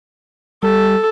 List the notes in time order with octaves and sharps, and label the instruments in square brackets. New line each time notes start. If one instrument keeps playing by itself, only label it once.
[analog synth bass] G3 [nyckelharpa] A4